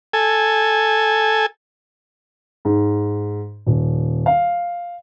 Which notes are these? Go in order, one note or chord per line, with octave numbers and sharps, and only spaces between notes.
A4 G#5
G#2
D#1
F5